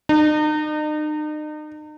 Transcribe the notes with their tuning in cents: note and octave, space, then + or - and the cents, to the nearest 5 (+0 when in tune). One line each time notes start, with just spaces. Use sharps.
D#4 -40